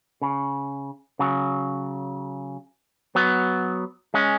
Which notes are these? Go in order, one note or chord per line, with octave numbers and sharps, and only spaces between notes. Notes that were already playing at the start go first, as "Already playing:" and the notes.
C#3
C#3 F#3
F#3 B3
G#3 C#4